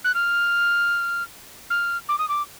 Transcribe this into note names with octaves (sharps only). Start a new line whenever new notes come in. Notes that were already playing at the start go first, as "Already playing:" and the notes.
F#6
F6
F6
D6
D#6
D6